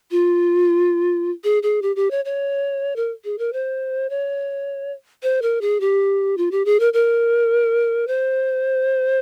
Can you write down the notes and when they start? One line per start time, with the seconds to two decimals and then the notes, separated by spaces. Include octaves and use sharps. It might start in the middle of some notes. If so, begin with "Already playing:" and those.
0.11 F4
1.44 G#4
1.63 G#4
1.82 G4
1.96 G4
2.11 C#5
2.25 C#5
2.96 A#4
3.25 G#4
3.38 A#4
3.53 C5
4.10 C#5
5.23 C5
5.42 A#4
5.61 G#4
5.81 G4
6.37 F4
6.51 G4
6.65 G#4
6.80 A#4
6.93 A#4
8.07 C5